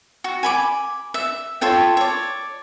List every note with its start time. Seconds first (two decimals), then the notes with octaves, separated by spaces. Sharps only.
0.24 F#4
0.43 G#5 B5 D6
1.14 E5
1.61 F4 A4 C#5 G5
1.97 C#5 D5